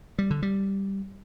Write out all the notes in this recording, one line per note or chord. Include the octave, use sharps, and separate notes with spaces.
G3
D3
G3